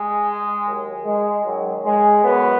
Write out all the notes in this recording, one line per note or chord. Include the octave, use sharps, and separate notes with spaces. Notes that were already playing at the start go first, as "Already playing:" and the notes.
Already playing: G#3
D#2 D#3 F#3
G#3
F#2 D#3 F#3
G#3
F#2 F#3 B3